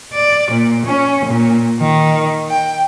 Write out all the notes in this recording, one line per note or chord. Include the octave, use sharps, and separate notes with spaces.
D5
A#2
C#4
A#2
D#3
G5